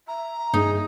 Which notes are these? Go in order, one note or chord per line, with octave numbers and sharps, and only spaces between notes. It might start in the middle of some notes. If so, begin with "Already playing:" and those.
E5 A#5
G2 D#4 G#4